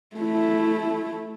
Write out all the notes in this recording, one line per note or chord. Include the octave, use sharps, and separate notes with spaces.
A3 E4